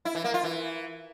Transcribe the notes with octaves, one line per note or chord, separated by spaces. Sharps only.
E4
E3
A#3
F4
E3